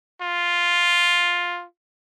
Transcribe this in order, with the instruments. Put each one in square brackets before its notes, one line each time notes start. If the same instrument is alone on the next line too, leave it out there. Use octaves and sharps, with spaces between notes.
[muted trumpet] F4